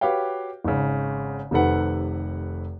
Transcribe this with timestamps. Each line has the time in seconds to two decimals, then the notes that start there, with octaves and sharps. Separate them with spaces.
0.01 F#4 G4 B4 C#5 F5 G5
0.65 G#1 C#3
1.51 F1 C3 D#3 A4 B4 F#5